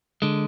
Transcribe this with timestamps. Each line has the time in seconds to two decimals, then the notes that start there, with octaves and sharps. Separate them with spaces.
0.22 D3 G#3